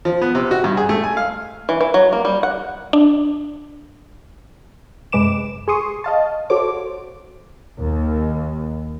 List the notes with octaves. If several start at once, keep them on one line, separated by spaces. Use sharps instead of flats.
F3
B3
C3
F#4
G2
G#4
A3
G#5
F5
E3
E3
F#3
A#3
G3
F#5
D4
F#2 C3 G#3 B4 D6 E7
G#4 C6 C#6 D#6
D#5 F5 A5
F#4 A4 C5 C#5 D6
D#2